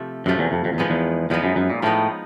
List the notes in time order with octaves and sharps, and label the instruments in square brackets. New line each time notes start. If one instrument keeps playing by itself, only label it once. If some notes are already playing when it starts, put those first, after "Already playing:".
Already playing: [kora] C3 F3 A3
[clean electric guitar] F#2 [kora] C3 F3 A3
[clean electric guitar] E2
F2
F2
E2
[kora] F3 G#3 B3 D#4
[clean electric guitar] E2
[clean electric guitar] E2 [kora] F3 G#3 B3 D#4
[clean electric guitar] F#2
F#2
A#2
[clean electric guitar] A2 [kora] F3 G#3 B3 D#4